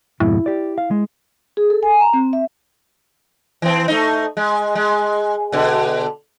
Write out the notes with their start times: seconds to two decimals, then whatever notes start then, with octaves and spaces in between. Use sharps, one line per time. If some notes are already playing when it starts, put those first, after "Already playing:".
0.20 F2 G#2 B2 E4
0.46 G4 D5
0.78 F5
0.91 G#3
1.57 G#4
1.70 A4
1.83 G#5
2.00 A#5
2.13 C4
2.33 E5
3.62 E3 C4
3.88 A3 D#4
4.37 G#3
4.75 G#3
5.52 B2 D3